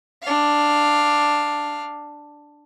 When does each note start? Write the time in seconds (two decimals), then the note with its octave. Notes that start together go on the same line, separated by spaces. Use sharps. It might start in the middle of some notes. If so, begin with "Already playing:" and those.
0.23 D4 F5